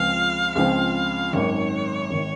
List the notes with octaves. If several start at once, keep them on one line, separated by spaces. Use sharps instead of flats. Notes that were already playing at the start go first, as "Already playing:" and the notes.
Already playing: C#2 C#3 F3 C4 F5
C#2 C#3 F3 C4 F5
G#1 F#2 D#3 C#5
G#1 D#3